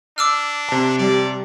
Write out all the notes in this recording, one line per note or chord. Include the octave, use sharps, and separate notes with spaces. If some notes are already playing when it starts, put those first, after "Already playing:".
D4 D6 E6 F6
C3 A5
G3 D5